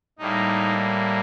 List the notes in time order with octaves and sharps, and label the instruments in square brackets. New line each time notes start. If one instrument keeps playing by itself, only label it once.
[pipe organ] A2 G3 A#3 D#4